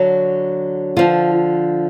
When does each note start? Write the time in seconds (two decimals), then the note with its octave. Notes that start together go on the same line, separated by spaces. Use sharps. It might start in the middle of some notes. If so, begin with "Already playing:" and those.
Already playing: D3 F#3
0.96 D3 F3 F4